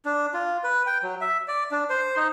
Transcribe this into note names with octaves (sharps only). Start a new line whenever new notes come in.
D4
F4
B4
G5
F#3
E5
D5
D4
C5
D#4